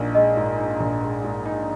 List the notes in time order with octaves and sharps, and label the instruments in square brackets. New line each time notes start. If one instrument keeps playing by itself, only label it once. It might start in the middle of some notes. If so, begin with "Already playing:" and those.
Already playing: [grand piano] A#1 D#4
[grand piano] G#3 [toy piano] D#5
[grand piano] G#2
D#4
A#1
G#3
G#2
D#4